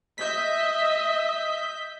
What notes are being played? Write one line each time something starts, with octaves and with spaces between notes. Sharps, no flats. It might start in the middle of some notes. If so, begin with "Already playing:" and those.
D#5 E5 G6 B6